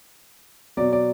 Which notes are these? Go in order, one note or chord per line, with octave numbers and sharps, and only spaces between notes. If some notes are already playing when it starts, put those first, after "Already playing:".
B2 F#3 D5
D5